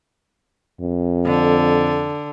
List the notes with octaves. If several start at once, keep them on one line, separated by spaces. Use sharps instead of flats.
F2
D3